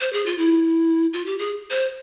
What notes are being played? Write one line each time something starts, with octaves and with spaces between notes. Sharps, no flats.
C5
G#4
F4
E4
F4
G4
G#4
C5